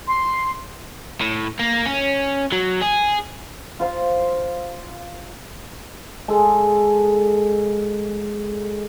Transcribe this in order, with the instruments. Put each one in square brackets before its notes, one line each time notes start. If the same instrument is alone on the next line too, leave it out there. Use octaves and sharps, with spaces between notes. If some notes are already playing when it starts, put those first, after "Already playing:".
[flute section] C6
[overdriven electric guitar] A2
A#3
C#4
F#3
G#4
[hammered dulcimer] F4 C5 F5
G#3 A4